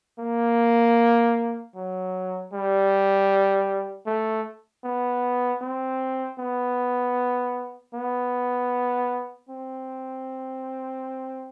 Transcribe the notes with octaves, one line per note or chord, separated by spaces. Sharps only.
A#3
F#3
G3
A3
B3
C4
B3
B3
C4